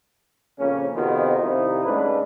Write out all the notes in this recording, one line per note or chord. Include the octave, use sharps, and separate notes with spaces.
A#1 F2 C#3 A#3 C#4
F2 C3 D#3 B3 F4 F#4
C2 C3 D#3 F3 D#4 E4
G#2 A3 C#4 D4 B4